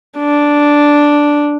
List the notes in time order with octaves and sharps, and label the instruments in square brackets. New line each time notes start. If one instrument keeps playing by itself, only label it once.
[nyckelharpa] D4